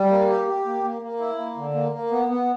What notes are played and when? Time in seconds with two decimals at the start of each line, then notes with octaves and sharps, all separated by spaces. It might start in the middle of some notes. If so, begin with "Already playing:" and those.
Already playing: G3
0.11 A#3
0.30 G4
0.48 G4
0.65 A#3
0.84 A#3
1.02 A#3
1.19 E4
1.38 A#3
1.57 D3
1.74 A#3
1.92 A#3
2.11 B3
2.29 B3